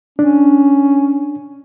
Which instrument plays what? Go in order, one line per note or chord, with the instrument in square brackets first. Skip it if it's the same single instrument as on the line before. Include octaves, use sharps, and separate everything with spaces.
[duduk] C#4 [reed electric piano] D4